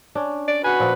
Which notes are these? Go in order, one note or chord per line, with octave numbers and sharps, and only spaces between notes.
C#4 D4
D5
F#4 B4 G#5
A#2 F3